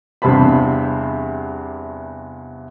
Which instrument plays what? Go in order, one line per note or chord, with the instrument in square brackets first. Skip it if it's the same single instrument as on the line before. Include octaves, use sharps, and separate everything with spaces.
[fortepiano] E2 G2 C3 C5 A5 B5